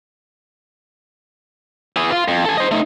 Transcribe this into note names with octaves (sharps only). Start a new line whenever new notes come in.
E3 G#4
F4
F2
A4 G#5
C5 D#5
A3 D#4